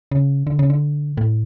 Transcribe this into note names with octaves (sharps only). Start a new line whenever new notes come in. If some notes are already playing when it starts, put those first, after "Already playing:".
C#3
D3
C#3
D3
A2